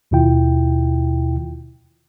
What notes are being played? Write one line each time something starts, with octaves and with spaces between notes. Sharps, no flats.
D#2 B2 D#3 E4 F4 G5